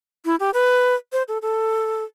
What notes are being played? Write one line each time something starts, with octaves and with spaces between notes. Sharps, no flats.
E4
G4
B4
C5
A4
A4